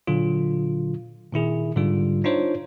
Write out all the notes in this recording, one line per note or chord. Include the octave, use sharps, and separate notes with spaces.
A#2 D3 F#3 F4
A#2 D#3 E4 G#4
G#2 D3 G3 F4
D4 D#4 F4 C5 C#5